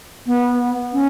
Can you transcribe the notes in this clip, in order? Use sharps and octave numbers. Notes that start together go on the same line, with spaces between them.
B3
C#4